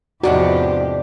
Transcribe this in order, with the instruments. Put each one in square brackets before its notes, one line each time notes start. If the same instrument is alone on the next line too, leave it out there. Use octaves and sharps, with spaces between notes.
[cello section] E2 F3 G4 [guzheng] G#2 C3 F#5 [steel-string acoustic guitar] D4 [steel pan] F#4